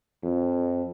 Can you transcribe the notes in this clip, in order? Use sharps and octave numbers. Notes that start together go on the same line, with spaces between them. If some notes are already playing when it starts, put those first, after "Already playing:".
F2